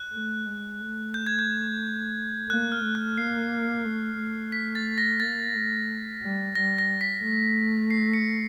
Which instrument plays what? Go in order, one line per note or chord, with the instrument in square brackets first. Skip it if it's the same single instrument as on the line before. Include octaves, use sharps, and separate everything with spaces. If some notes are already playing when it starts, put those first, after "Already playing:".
Already playing: [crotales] F#6
[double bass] A3
G#3
A3
[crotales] G6
G#6
G6
[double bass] A#3 [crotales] F#6
[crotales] F6
[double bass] A3
[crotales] F#6
[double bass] A#3 [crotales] C7
[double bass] A3
A3
[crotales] B6
A6
A#6
[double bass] A#3 [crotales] A6
[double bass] A3
G3
[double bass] G3 [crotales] A#6
[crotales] A#6
B6
[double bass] A3
[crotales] C7
C#7